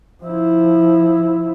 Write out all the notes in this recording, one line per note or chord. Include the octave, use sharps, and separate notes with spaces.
F3 E4